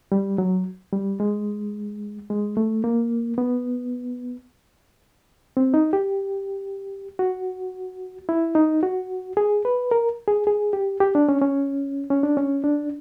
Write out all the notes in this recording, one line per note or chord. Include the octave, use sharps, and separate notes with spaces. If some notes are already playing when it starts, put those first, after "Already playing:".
G3
F#3
G3
G#3
G#3
A3
A#3
B3
C4
D#4
G4
F#4
E4
D#4
F#4
G#4
B4
A#4
G#4
G#4
G4
G4
D4
C#4
C#4
C#4
D4
C#4
D4